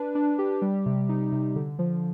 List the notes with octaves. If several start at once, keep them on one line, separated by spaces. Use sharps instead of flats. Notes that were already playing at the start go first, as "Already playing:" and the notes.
Already playing: D4 B4
D4
G4
G3
C3
D#4
C3
D3
F3